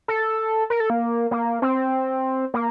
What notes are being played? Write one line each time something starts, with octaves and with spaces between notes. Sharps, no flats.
A4
A#4
A4
A#3
A#3
C4
A#3